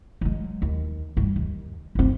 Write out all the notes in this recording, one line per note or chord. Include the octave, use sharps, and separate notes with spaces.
F#3 G#3
D#2
G2
D#2
G1 C4